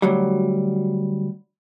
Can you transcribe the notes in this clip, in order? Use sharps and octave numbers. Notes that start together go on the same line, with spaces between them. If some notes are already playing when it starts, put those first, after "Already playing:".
D2 F#3 G3